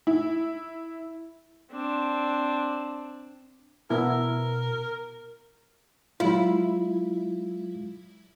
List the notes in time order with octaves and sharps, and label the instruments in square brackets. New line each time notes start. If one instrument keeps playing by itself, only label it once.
[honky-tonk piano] E4
[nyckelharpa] C4 D4
[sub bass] B2 [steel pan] B3 E4 [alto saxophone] A#4
[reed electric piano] F#3 G#3 F4 [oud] E4